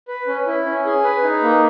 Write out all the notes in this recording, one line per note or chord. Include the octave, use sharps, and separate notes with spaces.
B4
C#4
E4
C#4
G#4
B4
D#4
A#3